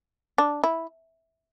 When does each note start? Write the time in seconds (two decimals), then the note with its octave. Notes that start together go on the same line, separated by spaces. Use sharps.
0.38 D4
0.64 E4